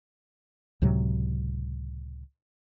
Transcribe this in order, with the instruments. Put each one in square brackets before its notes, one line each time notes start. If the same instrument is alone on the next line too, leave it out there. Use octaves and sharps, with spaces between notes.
[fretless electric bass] C#2 A2 C3 F#3